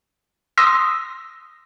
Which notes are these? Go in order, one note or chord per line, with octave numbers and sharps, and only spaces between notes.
C6 D#6 E6 A#6